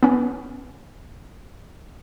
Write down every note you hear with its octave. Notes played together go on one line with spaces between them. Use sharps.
B3 C#4